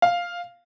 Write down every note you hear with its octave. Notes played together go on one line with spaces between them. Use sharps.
F5